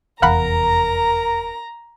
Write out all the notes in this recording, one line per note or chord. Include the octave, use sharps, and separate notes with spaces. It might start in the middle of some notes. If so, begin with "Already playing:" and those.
F1 E2 A#4 F5 F#5 A#5 B5